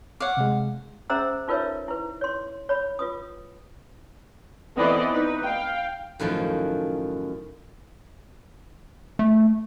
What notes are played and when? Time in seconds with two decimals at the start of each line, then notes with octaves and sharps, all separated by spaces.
0.20 C#5 F5 F#5 D6
0.37 C3 G#3
1.10 C#4 G#4 C5 E5 A#5 E6
1.48 D#4 F4 A#4 B4 C#5 E5
1.88 E4 B4
2.21 C#5 C6
2.69 C#5 B5
2.99 F4 B4 D#6
4.77 E3 B3 C4 A4 D5 D#5
5.09 D#4 B4
5.42 F5 G5
6.20 F#2 A2 D#3 F3
9.19 A3